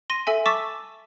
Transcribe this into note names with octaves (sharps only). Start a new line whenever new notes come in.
C6 A#6 D#7
A4 E5 G#5
A5 C#6 D6 E6 A6 B6